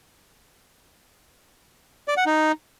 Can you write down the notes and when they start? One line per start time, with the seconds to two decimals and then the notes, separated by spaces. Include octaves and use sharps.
2.08 D5
2.17 F#5
2.26 D#4